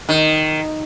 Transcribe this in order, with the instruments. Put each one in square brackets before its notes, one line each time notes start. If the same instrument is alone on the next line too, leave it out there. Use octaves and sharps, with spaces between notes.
[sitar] D#3